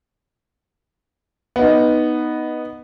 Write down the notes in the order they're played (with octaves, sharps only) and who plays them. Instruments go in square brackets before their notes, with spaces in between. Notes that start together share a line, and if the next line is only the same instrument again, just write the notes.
[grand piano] B3 D#4